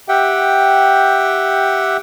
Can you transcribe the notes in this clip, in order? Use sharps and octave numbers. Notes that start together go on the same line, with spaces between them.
G4 E5 F#5 G5